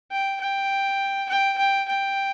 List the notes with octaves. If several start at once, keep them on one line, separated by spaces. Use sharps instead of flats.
G5
G5
G5
G5
G5